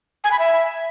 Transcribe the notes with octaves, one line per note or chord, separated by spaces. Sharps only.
G#5
B5
E5